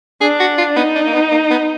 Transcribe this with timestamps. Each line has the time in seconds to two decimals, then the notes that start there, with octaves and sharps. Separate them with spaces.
0.21 D4 G#4
0.40 F#4
0.58 F4
0.76 B3 D#4
0.95 D4
1.07 A#3
1.14 B3
1.31 A#3
1.51 B3